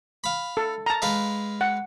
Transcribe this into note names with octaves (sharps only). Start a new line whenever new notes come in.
F5 B5
A4
A5 A#5
G#3 B4 F5
F#5